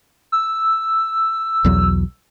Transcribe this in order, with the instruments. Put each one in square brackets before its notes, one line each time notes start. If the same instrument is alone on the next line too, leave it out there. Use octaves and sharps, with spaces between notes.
[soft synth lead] E6
[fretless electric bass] B1 E2 F#3